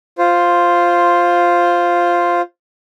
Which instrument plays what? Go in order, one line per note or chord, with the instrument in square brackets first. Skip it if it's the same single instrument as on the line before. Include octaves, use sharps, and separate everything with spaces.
[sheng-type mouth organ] F4 C5